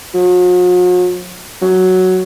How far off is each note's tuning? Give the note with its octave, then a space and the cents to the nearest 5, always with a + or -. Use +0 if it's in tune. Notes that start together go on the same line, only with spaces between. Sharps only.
F#3 -45
F#3 +5